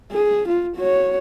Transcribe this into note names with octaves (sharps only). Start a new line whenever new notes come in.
G#4
F4
F#4 C#5